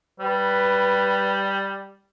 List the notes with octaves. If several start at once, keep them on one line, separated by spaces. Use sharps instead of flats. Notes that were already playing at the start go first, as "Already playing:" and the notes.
G3 B4